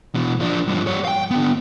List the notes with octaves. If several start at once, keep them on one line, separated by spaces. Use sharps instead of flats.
B2 E3
F3 D4
G2 F3
G3 C#5
F5 G5
D3 B3